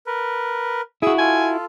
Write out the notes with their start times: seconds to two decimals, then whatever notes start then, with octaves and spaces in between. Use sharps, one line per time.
0.07 A#4 B4
1.02 E4 F#4 G#4 E6
1.19 F4 A4 G#5